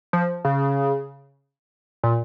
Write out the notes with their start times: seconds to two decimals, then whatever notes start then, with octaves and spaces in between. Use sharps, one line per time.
0.13 F3
0.45 C#3
2.03 A#2